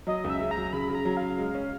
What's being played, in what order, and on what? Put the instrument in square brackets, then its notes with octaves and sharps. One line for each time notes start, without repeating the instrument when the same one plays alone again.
[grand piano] F#3 [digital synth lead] D#5
[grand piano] C#2
[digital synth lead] E5
[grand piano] C#3
[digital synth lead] A#5
[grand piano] F#3
[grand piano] C#3 [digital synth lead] B5
[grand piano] C#3
[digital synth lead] A#5
[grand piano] F#3
[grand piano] C#3 [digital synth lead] F5
[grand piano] G#3
C#4